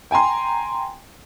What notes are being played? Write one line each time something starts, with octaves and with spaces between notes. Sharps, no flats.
G5 G#5 A#5 C6